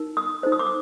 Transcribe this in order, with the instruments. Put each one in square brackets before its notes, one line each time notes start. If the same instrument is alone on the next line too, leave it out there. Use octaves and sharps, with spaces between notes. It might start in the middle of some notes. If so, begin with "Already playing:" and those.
Already playing: [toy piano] D#4 A#4
D#6
D#4 A4 C5
D#6
D6
D#6